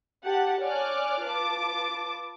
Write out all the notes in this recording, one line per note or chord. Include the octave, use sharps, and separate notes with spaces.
G4 F#5 A5
C#5 D5 G#5 D6 F6 F#6
F4 B4 A5 D6